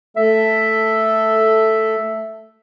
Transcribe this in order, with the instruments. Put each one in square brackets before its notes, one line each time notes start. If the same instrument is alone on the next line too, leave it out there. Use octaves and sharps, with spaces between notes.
[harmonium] A3 A4 [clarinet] E5